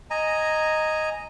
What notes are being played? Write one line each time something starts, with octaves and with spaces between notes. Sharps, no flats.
D#5 G#5 A#5